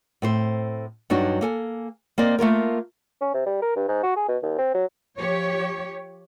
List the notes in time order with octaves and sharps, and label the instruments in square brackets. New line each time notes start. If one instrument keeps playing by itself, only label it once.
[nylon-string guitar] A2 C4 C5
G2 F#3 D4 D#4 F#4
A#3 A4 G#5
A#3 C4 D5 D#5
A3 A#3 F4 A#4
[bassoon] C#4
C3
G3
A#4
G2
G#2
F#4
G#4
B2
D#2
C4
F#3
[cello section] F3 G4 C#5